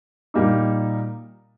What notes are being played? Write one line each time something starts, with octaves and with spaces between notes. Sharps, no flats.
A#2 G3 A#3 D#4